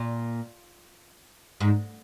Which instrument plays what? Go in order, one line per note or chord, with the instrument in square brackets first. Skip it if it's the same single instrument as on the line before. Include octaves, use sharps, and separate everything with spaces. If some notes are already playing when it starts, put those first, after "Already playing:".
Already playing: [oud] A#2
G#2